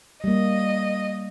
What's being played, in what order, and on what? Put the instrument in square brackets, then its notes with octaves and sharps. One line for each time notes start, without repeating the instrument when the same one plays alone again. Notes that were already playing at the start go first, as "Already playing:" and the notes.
[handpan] G3 A#3 [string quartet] D#5